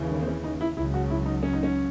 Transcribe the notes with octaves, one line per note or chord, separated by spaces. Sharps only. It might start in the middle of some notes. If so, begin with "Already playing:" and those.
Already playing: D#2 C#3 E3
D#3
C4
C#4
D#4
E4
C#2 C#3 F#3 E4
F#4
E4
D#4
C#4
D#4
C#4